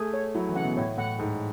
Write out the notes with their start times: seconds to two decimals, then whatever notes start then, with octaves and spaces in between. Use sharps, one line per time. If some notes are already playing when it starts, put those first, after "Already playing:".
Already playing: A3 G#4
0.14 C#5
0.35 F#3 E4
0.49 E3
0.56 C#3 F#5
0.63 B2
0.77 A2 C#5
0.98 A2 F#5
1.19 G#2 A4